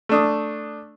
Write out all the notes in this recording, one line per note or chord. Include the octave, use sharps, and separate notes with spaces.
A3 D4 D#6